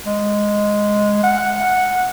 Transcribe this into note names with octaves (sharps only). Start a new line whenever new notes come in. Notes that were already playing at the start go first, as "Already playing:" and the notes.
G#3
F#5